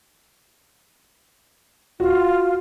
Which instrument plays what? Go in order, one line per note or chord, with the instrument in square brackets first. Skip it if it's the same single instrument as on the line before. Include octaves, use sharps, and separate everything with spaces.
[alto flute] F4 [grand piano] F#4